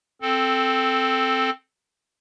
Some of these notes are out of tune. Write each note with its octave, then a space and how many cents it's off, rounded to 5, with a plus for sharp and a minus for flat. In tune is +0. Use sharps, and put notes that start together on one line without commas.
C4 +0 A4 +0